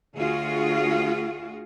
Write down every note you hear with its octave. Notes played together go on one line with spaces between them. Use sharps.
D2 F4 F#4 G#4